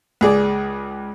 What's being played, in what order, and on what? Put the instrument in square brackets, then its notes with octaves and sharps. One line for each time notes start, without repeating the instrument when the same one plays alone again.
[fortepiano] C#2 G#4 D5